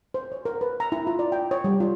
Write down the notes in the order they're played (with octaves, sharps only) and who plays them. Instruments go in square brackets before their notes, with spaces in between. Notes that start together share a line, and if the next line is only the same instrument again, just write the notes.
[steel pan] C5
C#5
A#4
B4
A#5
E4
F4
D5
G5
C#5
G3
F4